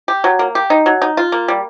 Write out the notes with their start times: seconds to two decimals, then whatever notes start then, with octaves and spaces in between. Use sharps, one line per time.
0.08 G4
0.24 F#3
0.39 A#3
0.55 G4
0.70 D#4
0.86 F#3
1.02 D#4
1.17 F4
1.32 A#3
1.48 G3